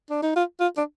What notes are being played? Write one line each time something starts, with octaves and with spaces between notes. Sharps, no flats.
D4
D#4
F4
F4
D4